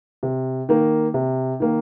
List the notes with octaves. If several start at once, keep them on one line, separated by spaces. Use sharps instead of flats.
C3
D#3 A#3
C3
D#3 A#3